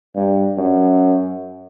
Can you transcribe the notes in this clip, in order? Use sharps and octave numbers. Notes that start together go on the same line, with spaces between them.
G2
F#2